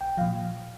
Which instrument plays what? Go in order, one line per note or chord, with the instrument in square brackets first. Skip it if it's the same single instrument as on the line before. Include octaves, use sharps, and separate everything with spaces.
[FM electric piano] A#1 G5
A#2 F3 F5